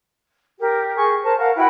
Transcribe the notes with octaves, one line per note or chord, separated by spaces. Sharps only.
G4 A#4
G#4 C#6
A#4 C5 A5
A#4 F5 F#5
E4 F#4 B4 G5